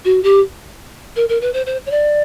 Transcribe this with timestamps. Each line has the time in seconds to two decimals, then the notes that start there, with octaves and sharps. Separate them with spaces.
0.05 F#4
0.23 G4
1.16 A#4
1.29 A#4
1.41 B4
1.53 C5
1.66 C5
1.86 C#5
1.91 D5